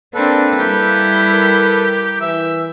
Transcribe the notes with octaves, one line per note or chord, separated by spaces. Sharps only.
A#3 C4 D4 A4 B4
G3 E4 G4
A#4
E3 E5